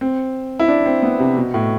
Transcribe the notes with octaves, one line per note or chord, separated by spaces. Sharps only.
C4
E4
D4
C4
B3
C3
B2
A2